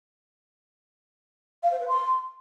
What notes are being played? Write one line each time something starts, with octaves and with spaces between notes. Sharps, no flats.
F5
C5
B4
C6